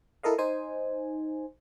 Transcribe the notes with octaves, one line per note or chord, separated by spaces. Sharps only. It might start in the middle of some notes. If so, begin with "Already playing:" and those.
E4 A4 A#4 D#5 F5
D#4 C5 G#5